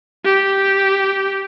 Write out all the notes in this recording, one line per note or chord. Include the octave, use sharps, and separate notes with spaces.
G4